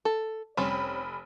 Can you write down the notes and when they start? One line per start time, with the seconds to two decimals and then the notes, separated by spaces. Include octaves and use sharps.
0.05 A4
0.57 F1 G3 C4 C#4 B5